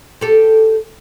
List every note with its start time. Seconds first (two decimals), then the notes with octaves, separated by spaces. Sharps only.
0.21 G4 A4